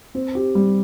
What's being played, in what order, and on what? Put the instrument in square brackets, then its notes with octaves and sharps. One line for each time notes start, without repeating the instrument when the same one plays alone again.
[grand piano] C4
G4
G3